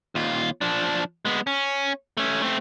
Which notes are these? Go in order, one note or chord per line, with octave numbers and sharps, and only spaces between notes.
D#2 F4
F3 D4
G#3 B3
C#4
A3 C#4
A3 C4